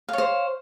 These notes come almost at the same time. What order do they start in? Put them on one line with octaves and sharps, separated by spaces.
F5 C#5 C5